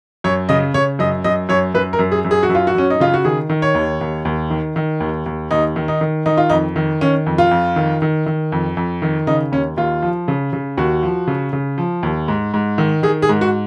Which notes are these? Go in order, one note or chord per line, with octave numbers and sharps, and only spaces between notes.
F#2 C#5
C#3 D#5
C#3 C#5
F#2 D#5
F#2 D#5
F#2 C#5
F#2 B4
A#4
F#2
G#4
F#2
G#4
F#4
F#2
F4
F#4
F#2 C#4
D#4
C#3 F4
F#4
D#3 G#4
D#3
C#5
D#2
D#2
D#2
D#3
D#3
D#2
D#2
D#2 D#4
D#3
D#4
D#3
D#3 D#4
F4
F2 D#4
D#3
D#3 C#4
F2
F4
F2
D#3
D#3
D#3
F2
F2
D#3
C#3 D#4
D#2 C#4
D#2 F4
F3
C#3
C#3
D#2 F#4
F3
C#3
C#3
F3
D#2
G#2
G#2
D#3
D#3 G#4
G#4
G#2
F#4